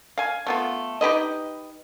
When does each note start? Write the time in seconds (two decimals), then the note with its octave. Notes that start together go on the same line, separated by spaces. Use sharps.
0.18 F5 G#5
0.47 A3 B3 F4
1.01 D#4 G4 B4 D#5